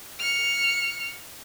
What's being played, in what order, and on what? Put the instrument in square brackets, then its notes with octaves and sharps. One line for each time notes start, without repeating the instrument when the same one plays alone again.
[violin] F6 C#7